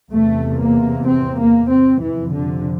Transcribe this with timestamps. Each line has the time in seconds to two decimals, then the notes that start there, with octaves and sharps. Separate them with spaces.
0.12 E2 C3 A3
0.59 A#3
1.07 C4
1.38 A#3
1.69 C4
2.01 F2 C3 E3
2.32 D3